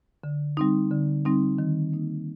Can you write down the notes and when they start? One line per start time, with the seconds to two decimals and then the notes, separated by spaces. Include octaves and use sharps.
0.24 D3
0.57 G3 C4 D#4
0.91 D3
1.25 G3 C4 D#4
1.59 D#3
1.93 A#3 D#4